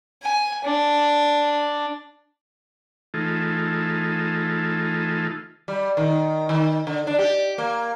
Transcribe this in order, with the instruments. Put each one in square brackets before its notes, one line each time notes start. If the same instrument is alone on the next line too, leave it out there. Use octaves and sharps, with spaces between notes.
[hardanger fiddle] G#5
D4
[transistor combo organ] E3 A3 D#4 F4 G#4 A4
[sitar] G3
D#3
D#3
D3
D4
G4
A#3